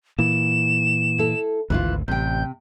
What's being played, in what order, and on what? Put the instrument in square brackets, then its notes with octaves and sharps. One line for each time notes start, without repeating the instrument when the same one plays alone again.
[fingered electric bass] A#2 E3 [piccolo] E7
[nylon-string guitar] E4 A4
[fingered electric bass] G#1 D2 [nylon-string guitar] E3 E4 F4 [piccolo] F#6
[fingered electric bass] A1 [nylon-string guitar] C3 G5 [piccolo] G6